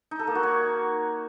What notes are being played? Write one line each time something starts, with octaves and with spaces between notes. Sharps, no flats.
D#4
A4
A#3
F#4
C#5